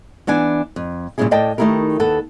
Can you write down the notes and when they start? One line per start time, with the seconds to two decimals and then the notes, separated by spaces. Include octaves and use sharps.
0.27 E3 B3 D4 G#5
0.76 F2
1.18 A#2 C#3 G3 C#4 E4 G#4
1.31 A2 A4 D5 D#5 G5 A5
1.58 D#3 A3 D#4 E4 G4 A#4
2.00 D#2 A4 B4 F#5 A5